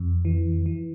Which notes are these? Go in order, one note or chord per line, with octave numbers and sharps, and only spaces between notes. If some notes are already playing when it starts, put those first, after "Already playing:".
Already playing: F2
E3
E3